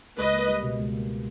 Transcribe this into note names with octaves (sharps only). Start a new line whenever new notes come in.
C#2 B4 D#5
A#3
G3
B2
C#2
A#3